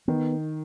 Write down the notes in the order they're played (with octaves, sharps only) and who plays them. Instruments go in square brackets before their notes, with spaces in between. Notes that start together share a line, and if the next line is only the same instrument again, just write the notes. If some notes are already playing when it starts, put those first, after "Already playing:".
[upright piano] D#3 [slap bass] B3